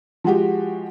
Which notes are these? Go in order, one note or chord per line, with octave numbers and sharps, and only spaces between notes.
F3 G#3 F#4 G4